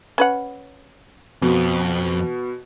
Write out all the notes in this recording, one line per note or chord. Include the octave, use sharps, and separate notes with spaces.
C#4 B4 F#5
F2 B2